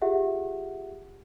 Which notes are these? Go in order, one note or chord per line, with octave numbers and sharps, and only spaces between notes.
F4 G4 G#4 E5 F#5